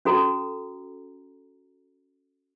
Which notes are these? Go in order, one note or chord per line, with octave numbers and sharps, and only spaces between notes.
C#4 F#4 A4 A#5